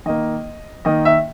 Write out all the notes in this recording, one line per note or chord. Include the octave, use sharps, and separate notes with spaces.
D#3 A#3 D#5
D#3 A#3 D#5
E5